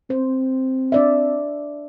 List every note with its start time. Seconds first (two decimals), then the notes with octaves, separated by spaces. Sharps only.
0.10 C4 C5
0.92 D4 D5 E5